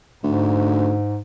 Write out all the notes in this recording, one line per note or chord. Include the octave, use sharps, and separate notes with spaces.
D2 G#2